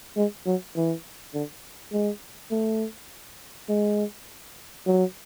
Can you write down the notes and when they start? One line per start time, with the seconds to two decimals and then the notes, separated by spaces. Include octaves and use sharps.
0.17 G#3
0.46 F#3
0.76 E3
1.34 D3
1.92 G#3
2.51 A3
3.69 G#3
4.86 F#3